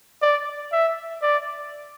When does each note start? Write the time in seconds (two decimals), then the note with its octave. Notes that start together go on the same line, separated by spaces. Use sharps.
0.22 D5
0.72 E5
1.22 D5